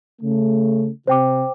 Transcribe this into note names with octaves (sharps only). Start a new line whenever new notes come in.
C#3 A3
C3 C5 G5 D6